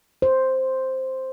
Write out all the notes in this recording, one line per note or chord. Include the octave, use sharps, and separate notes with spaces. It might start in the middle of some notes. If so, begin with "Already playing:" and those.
C5